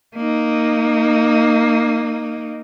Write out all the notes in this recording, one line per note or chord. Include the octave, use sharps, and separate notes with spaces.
A#3 D#4